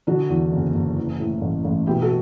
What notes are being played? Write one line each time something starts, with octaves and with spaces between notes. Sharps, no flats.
D3 D4 F#4
E2
F#1
F#1
E3
A2
A1
A1
B2 E4 G4
F#4 A4